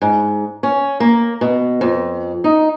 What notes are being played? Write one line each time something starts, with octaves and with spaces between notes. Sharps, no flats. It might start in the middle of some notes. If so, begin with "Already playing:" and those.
G#2
C#4
A#3
B2
F2
D#4